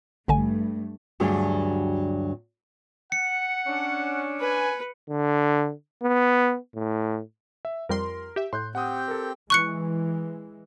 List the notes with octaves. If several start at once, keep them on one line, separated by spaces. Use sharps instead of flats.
A1 G2 D3 A3 G#5
D2 G2 F#3 G3 D4 G#4
F#5 C#7
C#4 D4
B4 G#5
D3
B3
A2
E5
F2 G3 A#4 C6
G4 E5
A2 C6 F#6 G6
C4 G4 F#5 G5 D#6
A4 A#4
E3 G#3 C#6 F#6 C#7